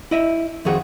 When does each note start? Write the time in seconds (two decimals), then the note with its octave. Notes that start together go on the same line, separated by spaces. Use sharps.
0.11 E4 D#5 E5
0.65 F2 D#3 F#4 G#4 C5 F#5